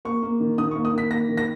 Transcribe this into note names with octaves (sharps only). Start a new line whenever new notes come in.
A#3 C#6
A#3
D#3
D#3 D#6
C#6
A#3
D#6
D#3 B6
A#3 A#6
D#3
A#6